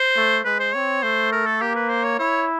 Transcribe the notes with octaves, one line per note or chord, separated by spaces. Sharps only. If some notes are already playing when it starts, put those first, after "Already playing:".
Already playing: C5
A3
G#3 B4
C5
C4 C#5
A3 C5
A#4
A4
A#3 G4
B4
C5
C#5
E4 C#5